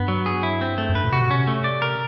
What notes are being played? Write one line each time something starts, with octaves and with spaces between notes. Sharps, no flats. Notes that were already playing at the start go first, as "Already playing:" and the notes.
Already playing: G2 B3
F#3
G#4
E4
C4
A3
F#2
G2 B4
A#2
C3 F#4
B2
C3 C#4
A3
D5
A#4